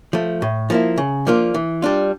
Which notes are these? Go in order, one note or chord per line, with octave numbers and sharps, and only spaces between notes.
F3 A3
A2
F3 A#3 E4
C#3
F3 A#3 D4 F4
E3
G3 D4 F4